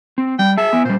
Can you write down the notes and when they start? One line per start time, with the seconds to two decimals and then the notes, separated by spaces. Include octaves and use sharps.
0.18 C4
0.39 G3 G5
0.57 G#4 E5 A5
0.73 B3 G#5
0.85 A#2 G3 C5